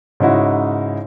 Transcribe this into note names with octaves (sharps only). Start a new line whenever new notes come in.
G#2 C#3 D#4 E4 F#4